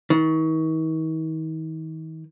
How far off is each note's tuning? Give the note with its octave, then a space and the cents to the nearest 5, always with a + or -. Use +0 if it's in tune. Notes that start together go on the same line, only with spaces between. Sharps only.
D#3 +40